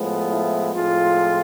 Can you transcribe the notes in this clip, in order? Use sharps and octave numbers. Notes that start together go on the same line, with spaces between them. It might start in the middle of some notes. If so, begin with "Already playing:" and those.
Already playing: A2 F3 G#3 B3
E4
A2 F3 G#3 C4 F4